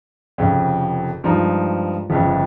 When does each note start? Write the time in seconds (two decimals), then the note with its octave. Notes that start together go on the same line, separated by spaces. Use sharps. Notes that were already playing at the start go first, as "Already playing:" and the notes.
0.38 F1 F2 C#3
1.24 G2 F3 G#3 D#4
2.10 G1 F2 C#3